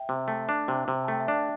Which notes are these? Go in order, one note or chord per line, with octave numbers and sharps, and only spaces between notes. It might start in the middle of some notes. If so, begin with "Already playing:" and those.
Already playing: E5 G5
C3
A3
D4
C3
C3
A5
A3 G5
E5
D4 D5